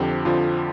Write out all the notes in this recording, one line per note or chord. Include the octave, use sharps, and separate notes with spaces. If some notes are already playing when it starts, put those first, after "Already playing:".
Already playing: F2 D3 F3 G4
F2 D3 F3 F4